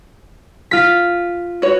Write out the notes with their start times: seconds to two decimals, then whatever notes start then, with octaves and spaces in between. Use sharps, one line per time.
0.71 F4 B6
1.62 F#4 B4 C#5